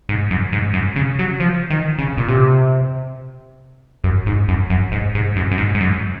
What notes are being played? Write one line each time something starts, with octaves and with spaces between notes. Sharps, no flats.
G#2
F#2
G#2
F#2
C#3
F#3
F3
D#3
C#3
A#2
C3
F#2
G#2
F#2
F#2
G#2
G#2
F#2
F#2
G#2
G#2
F#2